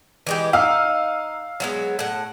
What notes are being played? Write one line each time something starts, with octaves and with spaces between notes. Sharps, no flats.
E3 G#3 G4
D#4 F5 E6
F#3 G#3 B3
A2 F#5